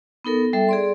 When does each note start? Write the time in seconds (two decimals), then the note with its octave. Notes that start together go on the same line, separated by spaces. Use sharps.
0.25 B3 D#4 A4 A#4
0.53 G3 A4 E5
0.69 G#4 D5 C6